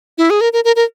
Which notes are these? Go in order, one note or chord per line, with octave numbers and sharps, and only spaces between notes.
E4
G#4
A#4
A#4
A#4
A#4